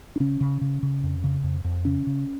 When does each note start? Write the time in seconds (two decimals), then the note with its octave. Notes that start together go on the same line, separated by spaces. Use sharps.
0.16 D4
0.20 C#3 C#4
0.41 C#3
0.61 C#3
0.83 C#3
1.03 F2
1.24 C#3
1.43 F2
1.64 F2
1.85 C#3 C#4
2.07 C#3